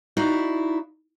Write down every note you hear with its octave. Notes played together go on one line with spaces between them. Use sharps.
D#4 E4 F#4 D5 F5